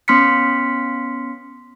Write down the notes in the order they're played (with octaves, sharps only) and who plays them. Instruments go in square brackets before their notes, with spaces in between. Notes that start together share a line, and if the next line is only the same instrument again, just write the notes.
[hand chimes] B3 C#4 C6 F6 B6 C#7